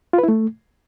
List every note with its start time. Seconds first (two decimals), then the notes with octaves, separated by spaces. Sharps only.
0.13 F4
0.18 B4
0.23 E4
0.29 A3